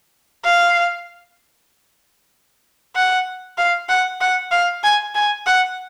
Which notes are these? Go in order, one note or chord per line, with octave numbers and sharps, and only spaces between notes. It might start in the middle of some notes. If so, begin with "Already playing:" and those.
F5
F#5
F5
F#5
F#5
F5
G#5
G#5
F#5